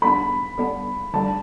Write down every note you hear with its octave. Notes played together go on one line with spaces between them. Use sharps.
D3 G3 B3 D4 B5
D3 G3 B3 D4
D3 G3 D4 A5